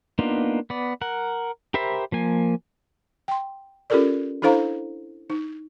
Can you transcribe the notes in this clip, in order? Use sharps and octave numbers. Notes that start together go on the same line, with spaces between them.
A#3 B3 D4 D#4 F4
B3 D5
A#4 F#5
G4 A#4 C5 E5 B5
F3 A#3 G#5
G5 C6
C#4 F4 G4 A4 A#4 D5
D4 E4 A4 C5 F5 A#5
D#4